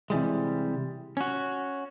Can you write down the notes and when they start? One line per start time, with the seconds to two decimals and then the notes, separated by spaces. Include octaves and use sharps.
0.10 C3 E3 G3 G#3
1.17 C#4 F#4